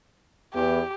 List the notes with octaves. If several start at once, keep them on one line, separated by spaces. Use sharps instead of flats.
E2 G4